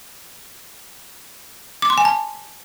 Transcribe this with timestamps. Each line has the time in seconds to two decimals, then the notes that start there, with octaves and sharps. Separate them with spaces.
1.82 D6
1.90 C6
1.98 G#5
2.05 A5